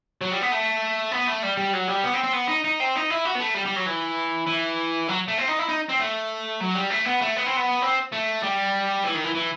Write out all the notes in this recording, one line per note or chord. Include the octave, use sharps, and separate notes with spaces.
F#3
G3
B3
A3
B3
A3
G3
G3
F#3
G3
B3
C4
C4
B3
D#4
D#4
C4
D#4
E4
F#4
B3
A3
G3
G3
F#3
E3
E3
F#3
A3
C4
D#4
E4
D#4
C4
A3
F#3
G3
A3
B3
A3
B3
C4
B3
C4
A3
G3
E3
D#3
E3
E3